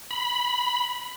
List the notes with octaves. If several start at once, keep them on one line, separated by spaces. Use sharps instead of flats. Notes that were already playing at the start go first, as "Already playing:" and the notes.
B5